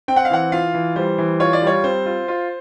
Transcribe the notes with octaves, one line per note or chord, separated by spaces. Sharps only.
C4 G5
F#5
F5
E3 F#5
F4 F5
E3
G3 C5
E3
F4 C#5
D5
G3 C#5
C4 C5
F4
F4